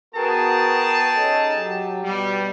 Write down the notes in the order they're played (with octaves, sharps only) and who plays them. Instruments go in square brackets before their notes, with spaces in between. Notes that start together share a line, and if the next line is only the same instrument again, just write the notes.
[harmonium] B3 F#4 A#4 [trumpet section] G#4 G5 A5
[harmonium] C#4 D#4 A4
F#3 G4
[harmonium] B2 [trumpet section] G3